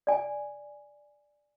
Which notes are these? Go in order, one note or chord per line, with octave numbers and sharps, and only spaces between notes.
D5 G#5